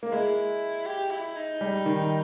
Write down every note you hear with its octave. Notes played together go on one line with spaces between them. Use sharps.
A#3
G#3 E4
G4
E4
D#4
G3
D#3